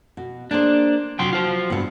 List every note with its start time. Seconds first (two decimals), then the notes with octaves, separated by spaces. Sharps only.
0.17 B2
0.51 A#3 D4 G#4 C5
1.19 C2 F#3 F#4 G5 C6
1.33 F4 C5
1.70 C#2 G2 B3 F#5